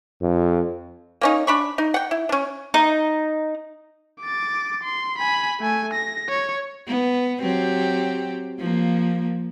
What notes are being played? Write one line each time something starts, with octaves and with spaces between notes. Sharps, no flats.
F2
A#3 C#4 D#4
D4 B5 C#6
D#4
F#5 G5
E4
C#4 D4
D#4
D6 A6
C6
G#5 B5
A3 G#5
A#6
C#5
B3
F#3 C4 G4
F3 A#3